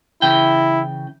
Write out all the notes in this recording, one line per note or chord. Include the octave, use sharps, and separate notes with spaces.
C#3 E3 E4 G5